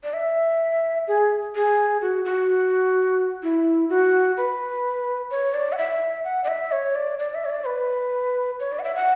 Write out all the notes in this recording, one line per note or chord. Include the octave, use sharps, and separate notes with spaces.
D5
E5
G#4
G#4
F#4
F#4
E4
F#4
B4
C#5
D5
F#5
E5
F#5
D5
E5
C#5
D5
D5
E5
C#5
D5
B4
C#5
D5
F#5
E5
F#5